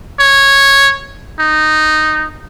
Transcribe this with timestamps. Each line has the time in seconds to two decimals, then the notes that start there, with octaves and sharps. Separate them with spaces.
0.20 C#5
1.39 D#4